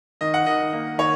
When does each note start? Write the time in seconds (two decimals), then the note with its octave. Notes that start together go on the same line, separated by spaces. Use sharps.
0.21 D#3 D#5
0.34 F#5
0.46 D#3 D#5
0.73 A#3
0.98 D#3 C#5